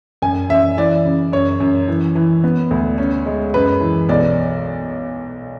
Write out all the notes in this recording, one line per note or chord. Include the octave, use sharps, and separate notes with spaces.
F#2 G#5
F#2 E5
E3 D5
C#3
F#2 C#5
F#2
E3
E3
B3
D2
C#4
G#3
F#2 B4
E3
B1 D5